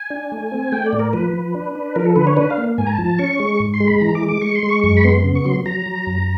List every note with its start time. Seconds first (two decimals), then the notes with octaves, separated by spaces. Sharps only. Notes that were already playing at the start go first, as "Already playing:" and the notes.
Already playing: G#5
0.10 D4
0.32 A3
0.52 C4
0.72 A3 G5
0.86 D5
0.93 A2
0.99 A#4
1.13 F3 B4
1.33 F3
1.54 D4
1.75 D4
1.96 F3 A#4
2.05 A4
2.16 D3 B4
2.27 C#5
2.37 D4 B4
2.50 F5
2.58 A#3
2.78 G#2 G#5
2.86 A#5
2.92 A5
2.99 F3
3.05 A5
3.19 C#4 C#6
3.40 G#3
3.60 G#2
3.74 C6
3.80 G#3
3.87 B5
4.01 E3 A#5
4.15 D6
4.22 G#3
4.29 D6
4.41 G#3 C#6
4.55 C6
4.63 G#3
4.69 C#6
4.83 F#2 C#6
4.97 B5
5.04 B3 C6
5.24 C#3
5.35 C#6
5.45 F#3 C6
5.66 F#3 A#5
5.86 F#3
6.07 F#2